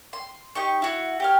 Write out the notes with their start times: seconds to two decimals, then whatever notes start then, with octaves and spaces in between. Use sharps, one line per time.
0.13 C6
0.55 D#4 G4 C#6
0.82 E4 F#4
1.20 G4 C#5 F6